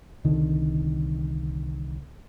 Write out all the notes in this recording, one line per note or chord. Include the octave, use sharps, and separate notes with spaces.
C2 D3 D#3